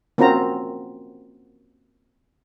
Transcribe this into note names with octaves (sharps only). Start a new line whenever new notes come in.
A#3 C4 C#4 F4 F#4 A#5